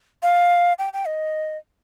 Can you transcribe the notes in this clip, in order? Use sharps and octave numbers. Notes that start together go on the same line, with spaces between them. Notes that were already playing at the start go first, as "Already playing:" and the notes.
F5
G5
G5
D#5